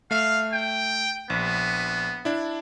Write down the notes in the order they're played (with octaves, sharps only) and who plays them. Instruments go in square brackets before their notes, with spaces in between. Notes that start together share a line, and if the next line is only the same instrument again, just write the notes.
[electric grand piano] A3 E5 [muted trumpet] F5
[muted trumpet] G5
[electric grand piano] A#1 [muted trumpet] B3
[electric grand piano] D4 E4